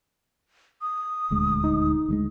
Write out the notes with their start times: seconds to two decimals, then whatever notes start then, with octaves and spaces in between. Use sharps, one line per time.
0.82 D#6
1.30 D#1 D2 G#3
1.64 D#4
2.08 D2 G3 G#3